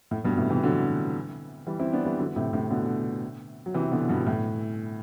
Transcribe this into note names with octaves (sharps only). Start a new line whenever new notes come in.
A2
G2 B2
A2 C3
C3 E3
D3 F#3
E3 G3
C4 E4
B3 D4
E3 G3
D3 F#3
A2 C3
A2 C3
B2 D3
F#3
C3 E3
B2 D3
G2 B2
A2